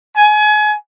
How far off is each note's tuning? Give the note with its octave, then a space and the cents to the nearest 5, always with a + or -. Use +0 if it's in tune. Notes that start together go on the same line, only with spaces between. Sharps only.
G#5 +30